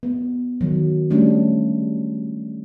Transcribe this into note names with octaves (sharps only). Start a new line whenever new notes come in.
B3
D#3 F#3
G3 A3 C#4 D4